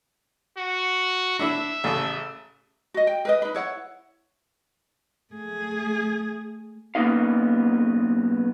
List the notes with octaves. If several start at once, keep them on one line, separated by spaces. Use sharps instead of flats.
F#4
D4 E4 E5
A1 C#3 A4
F#4 D#5
G5
A#4 B4 D#5
D#4 B4
E4 C#5 F#5
A3 G#4
B1 A#3 B3 C#4 D#4 F5